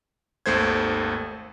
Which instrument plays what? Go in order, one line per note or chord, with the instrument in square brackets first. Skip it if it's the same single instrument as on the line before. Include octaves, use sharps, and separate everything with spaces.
[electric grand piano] G#1 D#2 A3 C5 G#6